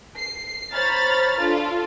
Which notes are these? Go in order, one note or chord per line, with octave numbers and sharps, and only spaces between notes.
C7
C5 C#5 A#5 B5 F6 A6
D4 F4 A4